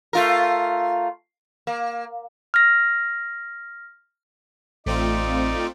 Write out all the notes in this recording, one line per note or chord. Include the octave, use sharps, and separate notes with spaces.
A3 F4 A#4
A#3
F6 A#6
A1 A3 C4 D#4 F4 D5